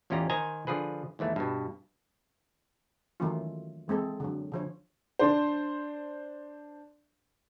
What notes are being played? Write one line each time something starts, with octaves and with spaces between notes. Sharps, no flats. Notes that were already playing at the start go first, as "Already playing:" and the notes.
A1 E2 C#4 F4 G4 A#5
D#3 C5 D#5 G#5 A#5
D3 F3 G#4 B4
D#2 G#2 E3 A3
G2 B2
D#3 E3 F#3 A3 C#4 F4
E3 G#3 C4 A4
D3 F#3
D3 F3 C#5
D4 C5